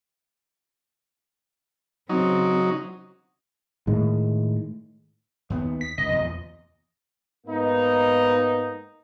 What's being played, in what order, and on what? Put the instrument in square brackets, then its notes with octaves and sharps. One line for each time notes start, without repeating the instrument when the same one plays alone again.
[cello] C#3 C4 [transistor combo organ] F#3 D#4
[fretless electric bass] A2 D#3 G#3
[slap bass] D#2 B3
[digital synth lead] B6
[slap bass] C#2 [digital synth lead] D#5
[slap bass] E2 A#2
[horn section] G#2 A#3 B3 D#4